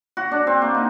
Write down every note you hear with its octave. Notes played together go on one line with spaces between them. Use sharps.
F#4
D4
C4
A#3
D#4